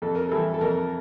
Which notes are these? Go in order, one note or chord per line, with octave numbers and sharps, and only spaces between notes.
F2 A4
A#4
E3 G3 A4
A4
F2 A#4